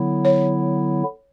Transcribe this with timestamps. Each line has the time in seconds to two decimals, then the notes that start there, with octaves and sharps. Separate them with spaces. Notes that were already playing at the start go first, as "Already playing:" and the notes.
Already playing: D3 F#3 B3 E4
0.25 C#5